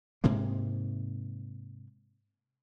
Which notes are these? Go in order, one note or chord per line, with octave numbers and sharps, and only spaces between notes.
G#2 C3 G#3 A#3